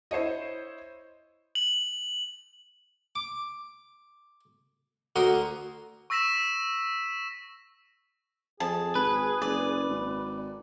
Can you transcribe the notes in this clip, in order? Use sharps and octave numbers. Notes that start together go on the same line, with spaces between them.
E4 C5 C#5 D#5
F#7
D6
D2 F#4 A#4 C6 D#6
C#6 E6 A#6 B6 E7
F2 G#4 A5
G#1 B4
F#1 D5
G#1